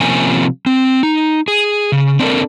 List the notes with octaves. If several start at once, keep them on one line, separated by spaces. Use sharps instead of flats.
C3 F3 A#3 C4 C#4 G#5
C4
D#4
G#4
C#3
C4 D4 D#4 A4 A#4